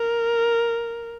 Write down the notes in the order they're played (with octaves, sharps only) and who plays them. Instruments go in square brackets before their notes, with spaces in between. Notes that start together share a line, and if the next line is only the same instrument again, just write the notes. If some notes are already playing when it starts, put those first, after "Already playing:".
Already playing: [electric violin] A#4